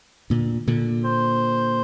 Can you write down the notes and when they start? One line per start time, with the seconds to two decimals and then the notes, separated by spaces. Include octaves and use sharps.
0.30 A#2 D3
0.67 A#2 D3
1.05 C5